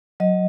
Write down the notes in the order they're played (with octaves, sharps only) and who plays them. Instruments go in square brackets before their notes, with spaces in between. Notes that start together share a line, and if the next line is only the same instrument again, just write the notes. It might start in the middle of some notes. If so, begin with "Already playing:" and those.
[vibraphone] F#3 D#5